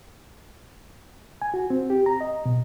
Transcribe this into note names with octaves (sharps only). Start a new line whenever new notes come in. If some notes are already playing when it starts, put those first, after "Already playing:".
G#5
F#4
C4
G4
A#5
D#5
B2